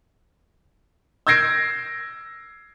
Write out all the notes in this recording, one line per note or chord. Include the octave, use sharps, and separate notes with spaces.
E6 G6 G#6 A#6 C7 D7